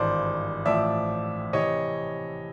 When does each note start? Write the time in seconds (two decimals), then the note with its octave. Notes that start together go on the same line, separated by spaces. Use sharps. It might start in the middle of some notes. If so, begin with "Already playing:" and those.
Already playing: G#1 G2 E3 C5 D5
0.65 A1 A2 F3 D5 E5
1.53 C3 E3 C#5 D#5